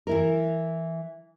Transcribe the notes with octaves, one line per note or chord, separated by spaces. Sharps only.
E3 E4 A#4